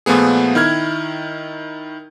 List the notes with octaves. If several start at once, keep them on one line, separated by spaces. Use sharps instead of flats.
A#2 F3 A3 B3 G#4
D#3 E4 F6 G#6